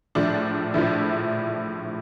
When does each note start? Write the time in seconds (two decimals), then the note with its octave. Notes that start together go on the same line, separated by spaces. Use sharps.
0.15 A#1 A2 F3 D4
0.74 A#1 A2 F3 E4